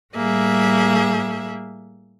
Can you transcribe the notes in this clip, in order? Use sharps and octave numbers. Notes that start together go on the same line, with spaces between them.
A2 G3 A#3 G#4 E5